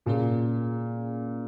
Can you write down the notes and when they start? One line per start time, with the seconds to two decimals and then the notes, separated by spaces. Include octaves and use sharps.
0.06 A#2 C#3 A#3 C#4 G#4